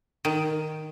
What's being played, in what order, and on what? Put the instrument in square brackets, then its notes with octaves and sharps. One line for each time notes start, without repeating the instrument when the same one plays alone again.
[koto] D#3